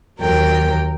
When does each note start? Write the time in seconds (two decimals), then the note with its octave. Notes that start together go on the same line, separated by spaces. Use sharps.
0.20 D#2 F#3 A#4 G5